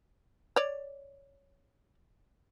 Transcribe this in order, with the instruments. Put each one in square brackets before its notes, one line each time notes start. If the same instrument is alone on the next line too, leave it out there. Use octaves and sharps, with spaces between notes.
[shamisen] C#5 D5